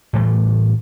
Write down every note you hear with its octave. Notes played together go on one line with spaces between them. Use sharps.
A2 E3 G3 A3